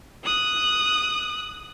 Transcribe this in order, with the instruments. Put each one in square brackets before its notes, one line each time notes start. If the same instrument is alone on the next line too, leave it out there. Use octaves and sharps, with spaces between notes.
[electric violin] D#6 F#6